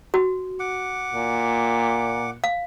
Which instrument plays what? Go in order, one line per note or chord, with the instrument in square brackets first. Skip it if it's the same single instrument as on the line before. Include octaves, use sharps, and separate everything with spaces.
[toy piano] F#4
[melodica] F#5 D6
[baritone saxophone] A#2
[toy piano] F5